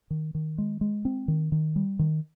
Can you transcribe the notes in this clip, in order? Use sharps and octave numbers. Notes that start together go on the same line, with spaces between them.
D#3
D#3
G#3
G#3
C4
D#3
D#3
G3
D#3